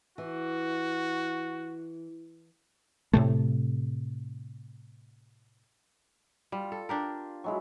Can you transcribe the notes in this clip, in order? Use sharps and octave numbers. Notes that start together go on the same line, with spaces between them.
E3 F#4
A2 C3 A3
G3 F4
A4
D4 G4 A#4
F#3 G#3 E4